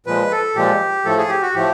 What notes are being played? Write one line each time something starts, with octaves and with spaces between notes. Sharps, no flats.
A#2 F3 G#3 B4
A4
A#2 F3 G#3 G4
A2 F3 A3 A4
G#4
G4
F#4
A2 F3 A3 G4